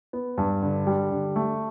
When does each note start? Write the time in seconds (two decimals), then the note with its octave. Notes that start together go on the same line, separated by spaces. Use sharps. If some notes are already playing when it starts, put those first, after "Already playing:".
0.13 B3
0.38 G2
0.62 D3
0.87 G3
1.11 D3
1.36 A3